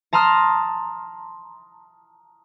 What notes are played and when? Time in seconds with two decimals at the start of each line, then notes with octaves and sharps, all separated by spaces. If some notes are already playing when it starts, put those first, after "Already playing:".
0.13 A5 A#5 C6 D#6 F6